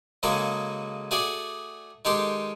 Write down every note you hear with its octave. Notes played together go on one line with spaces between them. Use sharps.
C#3 F#3 G#3 A#3 A4
A3 F#4 G#4 D5
D#3 G#3 G4 A4 C6